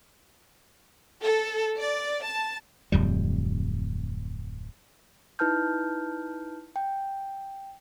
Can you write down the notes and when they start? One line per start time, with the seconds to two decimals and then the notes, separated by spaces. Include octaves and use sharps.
1.21 A4
1.78 D5
2.24 A5
2.92 D1 F2 G3
5.39 D#4 E4 B4 A5 F6 G6
6.76 G5